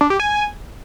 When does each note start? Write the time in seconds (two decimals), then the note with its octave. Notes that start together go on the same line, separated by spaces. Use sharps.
0.01 D4
0.10 G4
0.20 G#5